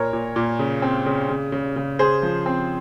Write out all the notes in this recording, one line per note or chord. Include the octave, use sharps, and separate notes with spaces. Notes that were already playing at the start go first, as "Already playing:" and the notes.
Already playing: A#2 A#4 C#5
A#2
A#2
C#3
C4
C#3
C#3
C#3
C#3
C#3 G#4 C5
F3
C4